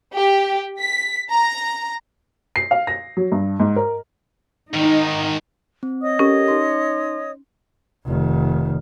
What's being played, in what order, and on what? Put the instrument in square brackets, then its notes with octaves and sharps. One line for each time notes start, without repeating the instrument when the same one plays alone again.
[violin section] G4
B6
A#5
[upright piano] C7
F5
A#6
F#3
G2
G#2
A#4
[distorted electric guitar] G#2 D#3 [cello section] D#4
[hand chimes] C4
[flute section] C#5 D#5 D#6
[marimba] C#4 [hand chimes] G4 A4 A#4
[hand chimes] D#4 C6
[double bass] F1 D#3